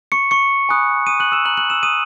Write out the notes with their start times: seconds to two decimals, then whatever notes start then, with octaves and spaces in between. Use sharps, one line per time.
0.12 C#6 C#7
0.31 C#6 C#7
0.69 G#5 B5 D#6 F#6
1.07 D#6 D#7
1.20 F#6 F#7
1.32 E6 E7
1.45 A#5 C#6 E6 F#6 F#7
1.57 F#6 F#7
1.70 E6 E7
1.83 D#6 D#7